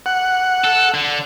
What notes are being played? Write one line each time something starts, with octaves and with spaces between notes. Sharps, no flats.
F#5
A4
D3